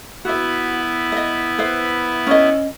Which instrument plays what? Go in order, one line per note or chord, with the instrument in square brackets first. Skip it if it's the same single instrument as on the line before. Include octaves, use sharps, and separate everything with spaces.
[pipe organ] B3 E4 [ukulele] F#4 E5
[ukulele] D#5 E5
B4 C5 E5
C#4 D#5